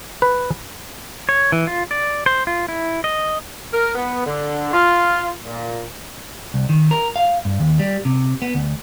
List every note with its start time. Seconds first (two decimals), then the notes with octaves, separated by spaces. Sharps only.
0.22 B4
1.29 C#5
1.52 E3
1.67 F4
1.91 D5
2.26 C5
2.47 F4
2.68 E4
3.04 D#5
3.72 A#4
3.95 B3
4.25 D3
4.72 F4
5.44 A#2
6.54 C2
6.69 D#3
6.91 A#4
7.16 F5
7.45 G2
7.60 D#2
7.79 G3
8.05 C3
8.42 B3
8.55 D2